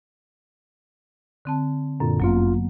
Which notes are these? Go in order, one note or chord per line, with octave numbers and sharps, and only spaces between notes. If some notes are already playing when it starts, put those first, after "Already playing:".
D3 C4 A5
F#2 A#2 D3
G1 F#2 F#3 A#3 B3 F4